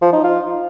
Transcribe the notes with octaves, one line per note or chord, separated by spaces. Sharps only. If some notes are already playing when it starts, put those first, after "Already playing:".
F3
D#4
F4